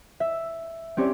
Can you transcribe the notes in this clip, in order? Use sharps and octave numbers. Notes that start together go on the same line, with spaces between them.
E5
C4 C#4 G4 C#5 D5